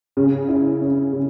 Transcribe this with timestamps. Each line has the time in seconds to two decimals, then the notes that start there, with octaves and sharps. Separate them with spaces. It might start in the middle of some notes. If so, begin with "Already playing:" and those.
0.17 C#3
0.48 E4
0.81 C#4
1.13 C#3